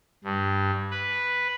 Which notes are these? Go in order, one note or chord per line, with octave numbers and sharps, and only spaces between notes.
G2
B4